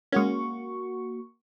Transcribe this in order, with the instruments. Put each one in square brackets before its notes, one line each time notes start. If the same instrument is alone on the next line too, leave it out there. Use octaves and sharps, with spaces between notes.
[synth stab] G#3 C#4 [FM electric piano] A#3 F#4 C#6